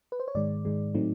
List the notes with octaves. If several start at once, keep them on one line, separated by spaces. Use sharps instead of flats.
B4
C5
C#5
G#2 D#3 G#3 D5
G#2 D#3 G#3
A2 F#3 A3 C4 D#4